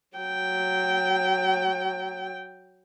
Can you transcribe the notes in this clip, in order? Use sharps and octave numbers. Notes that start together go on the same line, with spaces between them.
F#3 G5